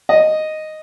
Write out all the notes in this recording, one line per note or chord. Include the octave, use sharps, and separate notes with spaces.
D#5